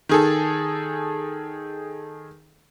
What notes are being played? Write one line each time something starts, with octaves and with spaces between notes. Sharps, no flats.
D#3 G#4 A4